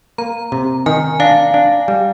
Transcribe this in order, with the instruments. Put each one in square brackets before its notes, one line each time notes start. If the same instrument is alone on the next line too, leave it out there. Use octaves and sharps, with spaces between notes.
[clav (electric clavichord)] A#3 [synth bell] A#5
[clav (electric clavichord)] C3
[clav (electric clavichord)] D#3 [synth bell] G#5
[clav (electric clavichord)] D4 [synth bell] F5
[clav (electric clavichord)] D4
G3